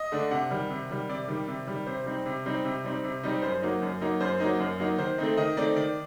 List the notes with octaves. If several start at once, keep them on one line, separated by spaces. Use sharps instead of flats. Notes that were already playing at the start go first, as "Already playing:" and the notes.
Already playing: D#5
D3 A3 D4
C3 F#5
D#3 G3
C3
D#3 G3
C3 D5
D#3 G3
C3
D#3 G3
C3 C5
G3 C4 D#4
C3
G3 C4 D#4
C3
G3 C4 D#4
C3
G3 C4 D#4
F#2 C5
F#3 A#3 D#4
F#2
F#3 A#3 D#4
F#2 C5
F#3 A#3 D#4
F#2
F#3 A#3 D#4
D#3 C5
A3 C4 D#4
D#3 D#5
A3 C4 D#4 D5
D#3 D5